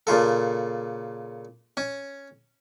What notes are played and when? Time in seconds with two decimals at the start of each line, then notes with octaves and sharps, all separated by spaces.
0.07 A#2 C#3 F4 A4
1.77 C#4